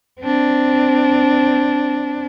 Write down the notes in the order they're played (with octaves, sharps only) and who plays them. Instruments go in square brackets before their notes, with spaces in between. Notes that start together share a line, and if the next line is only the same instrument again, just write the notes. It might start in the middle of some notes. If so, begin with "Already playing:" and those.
[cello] C4 D4